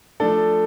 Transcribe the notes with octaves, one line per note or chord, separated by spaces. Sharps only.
F3 A3 D4 A4